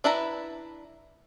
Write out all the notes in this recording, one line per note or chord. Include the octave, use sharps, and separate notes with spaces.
D4 E4 B4 A#5